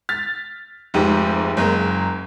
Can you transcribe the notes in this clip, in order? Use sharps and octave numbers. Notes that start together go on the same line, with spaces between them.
F6 A6 B6
F1 G#2 G4
F#1 G#3 A#3